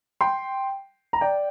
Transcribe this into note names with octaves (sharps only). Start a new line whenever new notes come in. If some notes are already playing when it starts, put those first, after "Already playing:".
G5 C6
A#5
D5 G5